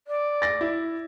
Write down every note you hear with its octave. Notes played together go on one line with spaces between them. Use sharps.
D5
A6 A#6
E4